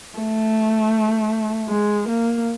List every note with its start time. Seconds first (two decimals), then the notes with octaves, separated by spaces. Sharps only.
0.18 A3
1.69 G#3
2.08 A#3